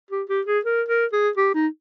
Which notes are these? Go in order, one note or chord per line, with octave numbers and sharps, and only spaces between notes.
G4
G4
G#4
A#4
A#4
G#4
G4
D#4